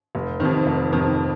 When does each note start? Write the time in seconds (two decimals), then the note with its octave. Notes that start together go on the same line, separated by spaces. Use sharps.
0.15 F1
0.40 F2 C3 D#3
0.66 F1
0.92 F2 C3 D#3